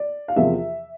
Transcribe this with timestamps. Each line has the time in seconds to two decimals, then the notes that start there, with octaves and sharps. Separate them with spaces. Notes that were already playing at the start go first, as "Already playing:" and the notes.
Already playing: D5
0.28 F5
0.36 E2 C3 F3 A#3 E5